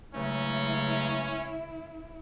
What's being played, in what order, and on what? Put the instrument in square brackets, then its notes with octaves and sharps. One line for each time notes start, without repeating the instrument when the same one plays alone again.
[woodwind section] G2 F#3 A3 [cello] C#3 G#3 [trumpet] C#4 [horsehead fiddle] E4